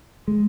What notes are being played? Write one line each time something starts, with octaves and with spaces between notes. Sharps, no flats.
G#3